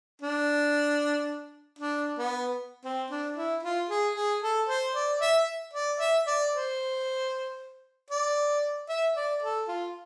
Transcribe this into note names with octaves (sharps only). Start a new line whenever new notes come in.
D4
D4
B3
C4
D4
E4
F4
G#4
G#4
A4
C5
D5
E5
D5
E5
D5
C5
D5
E5
D5
A4
F4